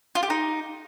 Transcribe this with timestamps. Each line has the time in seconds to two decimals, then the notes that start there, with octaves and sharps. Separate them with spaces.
0.15 F4
0.23 G4
0.30 D#4